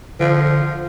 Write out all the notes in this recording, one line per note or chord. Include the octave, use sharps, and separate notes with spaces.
D3 F3